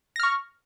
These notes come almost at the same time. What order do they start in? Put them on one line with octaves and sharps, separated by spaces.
A#6 F6 C#6